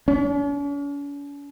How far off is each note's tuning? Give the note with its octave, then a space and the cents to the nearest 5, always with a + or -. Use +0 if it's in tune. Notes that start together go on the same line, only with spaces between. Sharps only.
C#4 +45